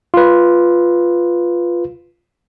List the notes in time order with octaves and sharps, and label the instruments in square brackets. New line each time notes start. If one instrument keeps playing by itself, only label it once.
[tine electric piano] F4 B4